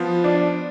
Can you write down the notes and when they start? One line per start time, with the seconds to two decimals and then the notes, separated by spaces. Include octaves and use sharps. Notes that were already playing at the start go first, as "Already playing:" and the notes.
Already playing: F3 B3 F4
0.24 D4